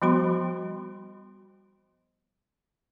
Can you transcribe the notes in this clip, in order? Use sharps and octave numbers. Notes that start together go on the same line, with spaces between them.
F3 G3 B3 F#4 B5 C6